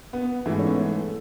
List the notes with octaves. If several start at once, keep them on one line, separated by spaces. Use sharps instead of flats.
B3
G#2 E3 A3
C#4
B3
A3